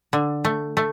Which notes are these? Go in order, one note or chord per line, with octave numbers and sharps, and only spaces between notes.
D3
A3
A3